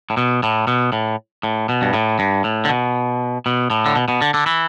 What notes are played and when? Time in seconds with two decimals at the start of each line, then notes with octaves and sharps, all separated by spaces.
0.10 A2
0.17 B2
0.43 A2
0.67 B2
0.92 A2
1.43 A2
1.69 B2
1.82 G2
1.94 A2
2.19 G2
2.44 A2
2.65 D3
2.69 B2
3.46 B2
3.70 A2
3.86 D3
3.96 B2
4.08 B2
4.22 D3
4.34 D3
4.46 E3